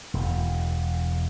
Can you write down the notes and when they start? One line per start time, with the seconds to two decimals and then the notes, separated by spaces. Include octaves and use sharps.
0.14 E1